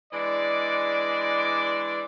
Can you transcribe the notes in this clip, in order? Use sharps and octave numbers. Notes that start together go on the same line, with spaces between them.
E3 G#3 D4 D5